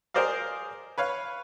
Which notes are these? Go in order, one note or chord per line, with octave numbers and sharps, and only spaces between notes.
G#4 A#4 C5 D5 D#5 F5
B4 C#5 F5